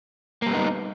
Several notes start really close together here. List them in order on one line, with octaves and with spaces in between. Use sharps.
A#3 G3 B3 D#4